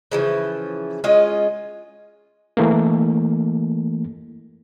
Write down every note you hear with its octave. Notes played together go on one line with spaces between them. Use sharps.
C#3 E3 F3
G#3 C#4 F4 D#5
E3 A3 A#3